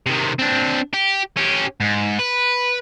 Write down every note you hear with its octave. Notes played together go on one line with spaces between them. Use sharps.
C3 D#3
C4 D4
G4
C#4 G4
G#2
B4